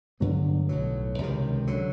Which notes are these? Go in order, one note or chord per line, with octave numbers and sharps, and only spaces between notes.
G2 D3 F#3 B3
B1 A2 F#3
C#2 C3 D#3
D3 F#3